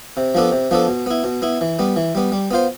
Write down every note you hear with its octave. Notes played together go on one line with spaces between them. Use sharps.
C3
F3 B3 D4 A4
C3
F3 B3 D4 A4
B2
B3 E4
B2
B3 E4
E3
G3 B3
E3
G3 B3
G3
B3 F4 C5